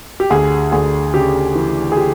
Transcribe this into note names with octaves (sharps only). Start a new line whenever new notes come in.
G4
D2 G#4
D2 G#4
C#3 G4
E3
G#4
G4